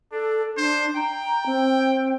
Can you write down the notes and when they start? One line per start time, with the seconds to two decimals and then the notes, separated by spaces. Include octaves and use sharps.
0.12 D4 A4
0.57 D4 C5
0.96 G5 A#5
1.46 C4